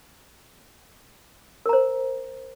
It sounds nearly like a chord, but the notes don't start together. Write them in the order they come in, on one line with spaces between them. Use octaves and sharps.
A#4 A#5 C5